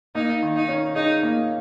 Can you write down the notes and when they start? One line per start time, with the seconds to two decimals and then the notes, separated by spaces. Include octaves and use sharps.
0.15 A#3 D#4
0.42 D#3
0.56 D#4
0.69 C#4
0.95 D#4 G#4
1.23 A#3